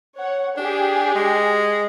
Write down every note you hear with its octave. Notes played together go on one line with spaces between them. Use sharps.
C#5 F#5
D4 G4 G#4
G#3